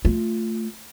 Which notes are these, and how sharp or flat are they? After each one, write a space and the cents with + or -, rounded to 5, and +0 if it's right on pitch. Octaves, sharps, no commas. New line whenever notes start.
A3 +10 F4 +0